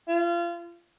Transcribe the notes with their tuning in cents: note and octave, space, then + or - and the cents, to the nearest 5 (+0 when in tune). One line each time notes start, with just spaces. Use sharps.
F4 -30